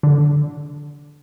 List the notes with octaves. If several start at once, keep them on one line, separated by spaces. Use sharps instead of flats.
D3